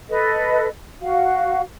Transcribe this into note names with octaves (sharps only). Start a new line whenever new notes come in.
A4 B4 D#5
F#4 F5